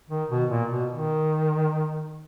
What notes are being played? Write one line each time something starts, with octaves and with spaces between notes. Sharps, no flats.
D#3
B2
A#2
B2
D#3